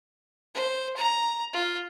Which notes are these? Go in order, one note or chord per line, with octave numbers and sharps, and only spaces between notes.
C5
A#5
F4